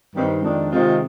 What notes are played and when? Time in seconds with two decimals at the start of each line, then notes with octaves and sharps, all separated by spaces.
0.15 G2 D#3 G3 C4 D#4
0.43 F2 D#3 G#3 D4
0.71 C3 D#3 G#3 C4 F4